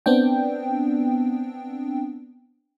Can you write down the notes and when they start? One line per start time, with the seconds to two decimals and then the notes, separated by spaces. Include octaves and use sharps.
0.06 B3 C4 D4 G5